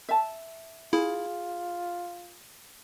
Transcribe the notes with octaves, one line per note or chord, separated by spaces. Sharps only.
E5 A5
E4 F4 G#4